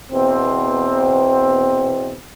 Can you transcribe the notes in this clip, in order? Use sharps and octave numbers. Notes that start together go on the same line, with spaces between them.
E2 B2 C4